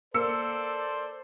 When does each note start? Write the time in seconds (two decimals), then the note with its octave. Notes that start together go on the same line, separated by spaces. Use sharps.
0.14 A#3 A4 C5 D5 E6 C#7